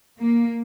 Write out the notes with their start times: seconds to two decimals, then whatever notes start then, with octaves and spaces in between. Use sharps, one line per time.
0.19 A#3